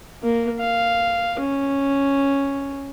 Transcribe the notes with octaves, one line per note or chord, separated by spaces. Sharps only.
A#3
F5
C#4